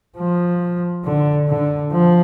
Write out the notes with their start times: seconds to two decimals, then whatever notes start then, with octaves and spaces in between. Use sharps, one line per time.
0.17 F3
1.05 D3
1.49 D3
1.92 F3